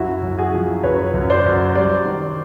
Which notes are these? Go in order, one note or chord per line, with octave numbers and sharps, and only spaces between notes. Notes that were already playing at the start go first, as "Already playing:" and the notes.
Already playing: F#2 E4 F#4
F#2
F#4 G#4
F3
F#2 B4 C#5
F#2
C5 D5
F#2
G3 C5 D5
D#3